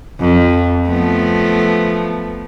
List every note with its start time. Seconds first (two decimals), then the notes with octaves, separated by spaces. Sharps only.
0.20 F2
0.86 F3 A3 B3